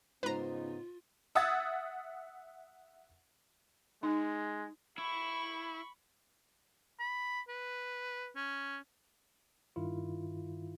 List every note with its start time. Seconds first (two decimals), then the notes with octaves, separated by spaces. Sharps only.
0.23 G#2 C#3 B3 D#4 F4 B4 C5 A#5
1.35 E5 F#5 D#6 E6 G#6 A6
4.03 G#3 D#4
4.98 E4 B5 C#6
7.00 B5
7.49 B4
8.36 C#4
9.76 G2 D#3 E4 F4